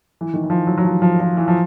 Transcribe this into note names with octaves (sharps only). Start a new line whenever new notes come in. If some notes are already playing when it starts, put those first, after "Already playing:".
E3
D#3
E3
F3
F#3
F#3
F3
F3
F3
E3
F3